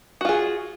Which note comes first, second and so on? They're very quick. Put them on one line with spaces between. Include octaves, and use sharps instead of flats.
F#4 F4 G#4